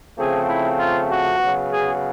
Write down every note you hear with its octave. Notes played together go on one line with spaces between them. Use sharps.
C#3 F3 A3 C4 G#4
E4
F4
F#4
C#3 F#3 B3
G#4